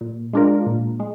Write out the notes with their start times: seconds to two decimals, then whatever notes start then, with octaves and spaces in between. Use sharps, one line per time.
0.01 A#2
0.33 G#3 D4 F4 A#4
0.66 A#2
1.00 G#3